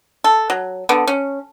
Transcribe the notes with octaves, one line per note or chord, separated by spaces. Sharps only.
A4
F#3
D3 B3
C#4